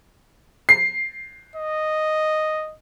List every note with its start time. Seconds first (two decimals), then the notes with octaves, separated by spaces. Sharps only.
0.69 C7
1.56 D#5